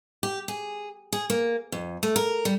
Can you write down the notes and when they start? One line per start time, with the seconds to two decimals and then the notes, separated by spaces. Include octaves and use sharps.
0.23 G4
0.48 G#4
1.13 G#4
1.30 A#3
1.72 F2
2.03 A3
2.16 A#4
2.45 G3